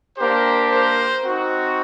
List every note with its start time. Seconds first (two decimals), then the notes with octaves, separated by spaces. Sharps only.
0.17 A#3 D4 G4 A#4 C5
0.70 A#4 C5
1.23 C4 D#4 F#4